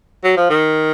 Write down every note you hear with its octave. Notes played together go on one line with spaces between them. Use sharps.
F#3
F3
D#3